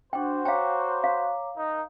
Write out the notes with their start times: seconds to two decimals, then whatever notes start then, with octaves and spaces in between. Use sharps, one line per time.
0.13 D4 F#4 C5 F#5 G5
0.45 C#5 F5 G5 A#5 D6
1.04 F5
1.57 D#4 A#4